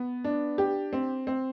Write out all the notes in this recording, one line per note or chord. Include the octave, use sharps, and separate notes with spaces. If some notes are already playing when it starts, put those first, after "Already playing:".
Already playing: B3
D4
G4
C4
C4